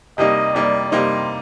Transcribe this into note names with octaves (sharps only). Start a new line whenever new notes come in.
C3 G3 A#3 D#4 D#5
C3 G3 A#3 D#4 D5
C3 G3 A#3 D#4 C5